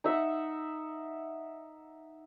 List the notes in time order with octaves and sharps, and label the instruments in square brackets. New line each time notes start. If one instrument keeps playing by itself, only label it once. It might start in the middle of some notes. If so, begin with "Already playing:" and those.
[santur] D#4 E5 F#5